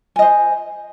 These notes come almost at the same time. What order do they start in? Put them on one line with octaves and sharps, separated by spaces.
G#5 D#5 C5